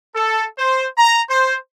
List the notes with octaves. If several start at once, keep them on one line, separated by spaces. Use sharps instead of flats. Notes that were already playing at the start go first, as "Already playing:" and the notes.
A4
C5
A#5
C5